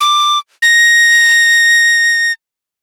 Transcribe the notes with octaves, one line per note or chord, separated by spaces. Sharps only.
D6
A#6